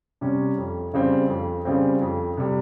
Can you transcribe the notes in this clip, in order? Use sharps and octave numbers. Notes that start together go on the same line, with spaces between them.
C3 G3 C#4
F2
C#3 G3 C4
F2
C#3 G3 C4
F2
C3 G3